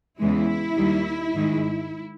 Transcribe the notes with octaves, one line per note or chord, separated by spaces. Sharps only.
E2 C#3 E3 G#3 E4
D#2 D#3 G3
G#2 D#3 G#3